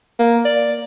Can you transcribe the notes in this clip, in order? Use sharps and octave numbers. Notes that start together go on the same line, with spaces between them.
A#3
D5